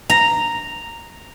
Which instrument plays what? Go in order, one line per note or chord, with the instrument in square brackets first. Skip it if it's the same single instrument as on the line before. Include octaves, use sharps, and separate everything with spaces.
[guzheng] A#5